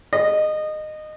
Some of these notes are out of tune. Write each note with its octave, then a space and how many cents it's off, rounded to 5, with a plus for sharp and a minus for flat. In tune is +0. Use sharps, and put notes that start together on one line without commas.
D#5 -20